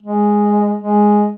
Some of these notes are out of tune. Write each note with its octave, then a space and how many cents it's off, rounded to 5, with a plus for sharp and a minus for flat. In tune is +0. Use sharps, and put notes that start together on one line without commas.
G#3 -5
G#3 +0